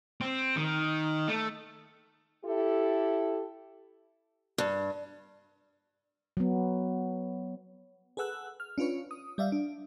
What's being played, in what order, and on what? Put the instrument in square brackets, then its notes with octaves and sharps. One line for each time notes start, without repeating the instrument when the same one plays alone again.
[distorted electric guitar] C4
D#3
A3
[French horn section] E4 G4 A4
[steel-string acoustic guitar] G2
[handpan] F#3 B3
[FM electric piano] G#4 A4 B4 F#5 E6 F#6
F6
C#4 D4 F4 B4 C#5
D#6
G3 D5 E5 F5
D4